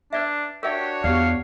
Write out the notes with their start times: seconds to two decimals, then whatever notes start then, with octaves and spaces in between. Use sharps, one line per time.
0.13 D4 B4 D5 E5
0.63 D4 F#4 G4 A#4 C#5 E5
1.04 E2 G4 D5 F5